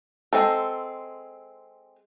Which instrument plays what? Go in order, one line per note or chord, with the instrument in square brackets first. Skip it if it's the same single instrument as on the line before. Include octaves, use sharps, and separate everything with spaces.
[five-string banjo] G#3 C4 A4